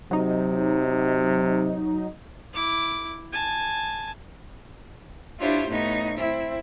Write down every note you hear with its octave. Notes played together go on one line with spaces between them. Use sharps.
C3 F#3 D#4
E4 D6
G#5 A5
D4 E4 F4 G4 C5 C#5
A2 B3 D#4 C#6
C4 E4